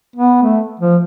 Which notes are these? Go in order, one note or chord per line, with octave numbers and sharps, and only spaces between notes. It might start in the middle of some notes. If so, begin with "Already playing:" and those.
B3
A3
F3